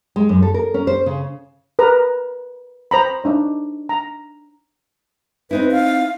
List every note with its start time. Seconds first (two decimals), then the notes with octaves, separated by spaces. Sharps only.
0.16 G#3
0.29 F#2
0.42 A4
0.54 A#4
0.74 C#4
0.87 C5
1.06 C#3
1.79 A#4 B4 A#5
2.91 C5 A#5 B5
3.24 D4 D#4 C#5
3.89 A#5
5.51 C4 D#4 E4 B4
5.71 F5